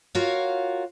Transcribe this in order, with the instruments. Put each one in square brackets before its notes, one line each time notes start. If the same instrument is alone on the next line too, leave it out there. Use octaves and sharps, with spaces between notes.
[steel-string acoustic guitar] F4 F#4 A#4 C#5 F5